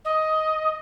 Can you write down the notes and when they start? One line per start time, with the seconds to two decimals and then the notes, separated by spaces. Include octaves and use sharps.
0.05 D#5